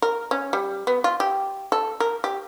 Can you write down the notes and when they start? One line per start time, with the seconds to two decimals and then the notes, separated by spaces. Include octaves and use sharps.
0.02 A#4
0.31 C#4
0.53 G3
0.87 B3
1.04 F4
1.20 G4
1.72 A4
2.00 A#4
2.24 G4